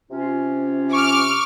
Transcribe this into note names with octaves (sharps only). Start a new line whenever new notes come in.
C3 C#4 F4
C#6 D6 F6